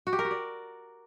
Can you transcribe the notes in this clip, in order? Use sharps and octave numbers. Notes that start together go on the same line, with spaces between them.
F#4
G4
A#4
F#4
D5